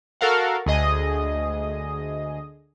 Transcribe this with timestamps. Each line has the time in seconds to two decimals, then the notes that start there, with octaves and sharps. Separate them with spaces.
0.21 F#4 A4 A#4 F5 F#5
0.66 D2 G#4 D#5 D#6